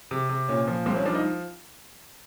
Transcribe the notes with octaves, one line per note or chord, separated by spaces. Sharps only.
C3
C3
A#2 C#4
F3
C2 C4
C#4
F3 D4
D#4